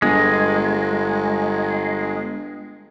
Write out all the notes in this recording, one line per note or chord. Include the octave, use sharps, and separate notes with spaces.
G1 G#3